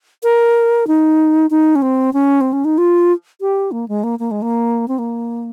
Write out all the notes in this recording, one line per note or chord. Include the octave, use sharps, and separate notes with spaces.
A#4
D#4
D#4
C#4
C4
C#4
C4
C#4
D#4
F4
G4
A#3
G#3
A#3
A#3
G#3
A#3
C4
A#3